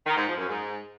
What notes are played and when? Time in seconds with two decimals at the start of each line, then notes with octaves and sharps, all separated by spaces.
0.05 D#3
0.16 G#2
0.27 F3
0.38 F#2
0.48 G#2